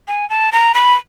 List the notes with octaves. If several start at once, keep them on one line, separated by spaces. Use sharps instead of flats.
G#5
A5
A#5
B5